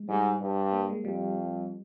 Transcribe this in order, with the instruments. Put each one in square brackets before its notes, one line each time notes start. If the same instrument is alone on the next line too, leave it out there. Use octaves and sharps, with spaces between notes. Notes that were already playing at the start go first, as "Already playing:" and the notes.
Already playing: [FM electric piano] G#3
[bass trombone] G#2 [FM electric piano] G3
[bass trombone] G2
[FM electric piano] A#3
G#3
[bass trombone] F2 [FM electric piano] G3